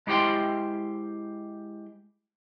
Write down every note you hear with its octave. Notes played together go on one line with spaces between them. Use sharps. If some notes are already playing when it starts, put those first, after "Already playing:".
G#3 E4 G4 C5 G5 C6